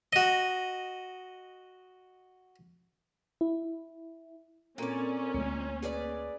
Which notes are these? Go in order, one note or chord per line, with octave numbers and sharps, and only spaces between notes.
F#4 D#5
E4
A#2 C4 C#4 A4 A#4 D5
D2 G#3 A#3
G#4 B4 D5